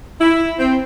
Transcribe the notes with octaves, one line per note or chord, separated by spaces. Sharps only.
E4
C4